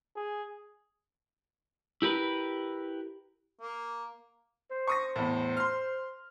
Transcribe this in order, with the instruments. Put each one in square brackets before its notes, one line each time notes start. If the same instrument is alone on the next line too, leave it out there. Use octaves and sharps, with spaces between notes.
[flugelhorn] G#4
[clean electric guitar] E4 G4 A#4 B4
[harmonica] A#3
[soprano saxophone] C5
[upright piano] C#6 D#6 A#6
E2 A2
C6 F6